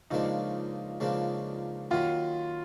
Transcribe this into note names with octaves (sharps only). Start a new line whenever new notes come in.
C#2 C#3 F3 A#3 D4 D#4
C#2 C#3 F3 A#3 D4
D#2 D#3 F#3 F4